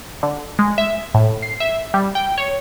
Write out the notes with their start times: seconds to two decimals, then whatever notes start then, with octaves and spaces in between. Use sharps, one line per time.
0.23 D3
0.59 G#3
0.78 E5
1.14 A2
1.42 C7
1.60 E5
1.94 G3
2.15 G5
2.38 C#5